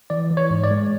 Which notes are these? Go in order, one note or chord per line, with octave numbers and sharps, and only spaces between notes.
E3 D5
E3
C#5
G#2
D5
G#3